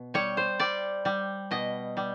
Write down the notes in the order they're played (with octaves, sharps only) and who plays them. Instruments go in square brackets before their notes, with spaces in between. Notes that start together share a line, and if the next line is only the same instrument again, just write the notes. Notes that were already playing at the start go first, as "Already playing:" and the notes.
Already playing: [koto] B2
G3 C#5
C5
G3 D5
G3
B2 D#5
G3